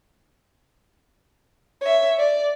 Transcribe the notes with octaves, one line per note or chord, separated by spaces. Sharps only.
C#5 E5
D5